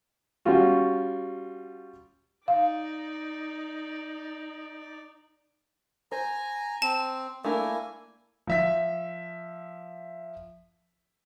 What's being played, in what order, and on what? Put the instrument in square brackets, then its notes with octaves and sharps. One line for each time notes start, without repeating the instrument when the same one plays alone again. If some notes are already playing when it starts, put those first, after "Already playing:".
[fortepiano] G3 C#4 F4 F#4
[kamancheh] D#4 D5 [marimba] F5
[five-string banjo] C5 [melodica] G#5 A#5
[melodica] C4 [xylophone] A5
[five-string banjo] A3 D4 A#4 [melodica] A#3 E4 G#5
[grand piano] F3 E5 B6